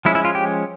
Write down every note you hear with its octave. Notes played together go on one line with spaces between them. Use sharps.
F3 G#3 C#4 E4
E4
F4
G4